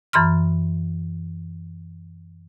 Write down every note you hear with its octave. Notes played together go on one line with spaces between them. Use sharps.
F#2 E3 B5 C6 F6